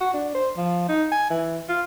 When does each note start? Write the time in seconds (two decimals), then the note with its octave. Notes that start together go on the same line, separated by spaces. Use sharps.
0.01 F#4
0.13 D4
0.35 C5
0.57 F3
0.88 D#4
1.12 G#5
1.30 E3
1.69 F4